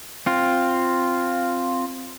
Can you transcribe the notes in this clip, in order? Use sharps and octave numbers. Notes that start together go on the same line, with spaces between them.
C4 F4